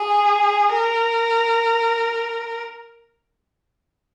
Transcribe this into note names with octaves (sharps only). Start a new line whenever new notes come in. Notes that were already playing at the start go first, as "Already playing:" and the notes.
Already playing: G#4
A#4